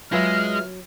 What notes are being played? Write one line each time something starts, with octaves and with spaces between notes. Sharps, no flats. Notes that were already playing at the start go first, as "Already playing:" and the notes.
F#3 G#3 F4 G#4 B4 E5 F6